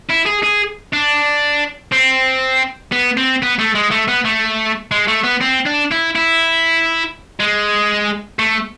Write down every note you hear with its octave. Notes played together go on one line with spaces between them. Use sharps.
E4
G#4
G#4
D4
C4
B3
C4
B3
A3
G#3
A3
B3
A3
G#3
A3
B3
C4
D4
E4
E4
G#3
A3